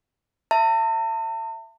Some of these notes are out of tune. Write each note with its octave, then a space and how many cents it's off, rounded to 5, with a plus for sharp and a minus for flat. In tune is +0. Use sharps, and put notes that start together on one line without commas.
E5 +20 A5 +40